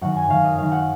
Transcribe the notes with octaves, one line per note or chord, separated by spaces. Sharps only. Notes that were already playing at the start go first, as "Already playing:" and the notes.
F#2 D#3 F#5
G#5
F#2 D#3 F5
D#5
F#2 D#3 F5
F#5